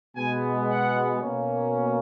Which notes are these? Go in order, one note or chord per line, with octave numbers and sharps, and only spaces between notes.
B2 G#3 B3 G#5
F#5
B2 A#3 C#4